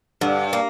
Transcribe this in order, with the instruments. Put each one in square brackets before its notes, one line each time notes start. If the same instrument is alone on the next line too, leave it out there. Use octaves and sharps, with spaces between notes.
[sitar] G2 [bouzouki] D3
[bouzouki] A#3